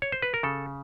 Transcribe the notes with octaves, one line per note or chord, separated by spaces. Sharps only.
C#5
C5
B4
A#4
C#3 A4